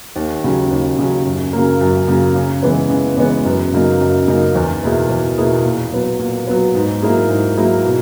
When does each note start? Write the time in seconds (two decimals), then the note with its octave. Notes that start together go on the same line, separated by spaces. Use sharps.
0.16 D#2
0.44 C#3 F#3
0.71 D#2
0.99 C#3 F#3
1.25 F#2
1.53 C#3 F#3 A#3
1.81 F#2
2.08 C#3 F#3 A#3
2.35 C#3
2.63 E3 G#3 B3
2.90 C#3
3.17 E3 G#3 B3
3.45 F#2
3.73 C#3 F#3 A#3 D#4
4.01 F#2
4.27 C#3 F#3 A#3 D#4
4.55 E2
4.83 B2 A#3 E4 G#4
5.09 E2
5.38 B2 A#3 E4 G#4
5.65 A#2
5.92 F#3 B3
6.19 A#2
6.47 F#3 B3
6.75 G#2
7.02 F#3 A#3 E4 G#4
7.29 G#2
7.57 F#3 A#3 E4 G#4
7.85 B2